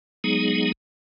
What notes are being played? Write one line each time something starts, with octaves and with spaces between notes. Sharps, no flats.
F#3 G#3 B3 D#4 G#4